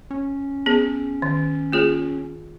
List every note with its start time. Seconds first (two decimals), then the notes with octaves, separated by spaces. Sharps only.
0.11 C#4
0.66 B3 G#4
1.22 D#3
1.72 A#3 F4 G#4